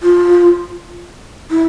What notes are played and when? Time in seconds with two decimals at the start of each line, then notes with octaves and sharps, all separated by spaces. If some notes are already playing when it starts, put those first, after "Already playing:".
0.03 F4
1.51 E4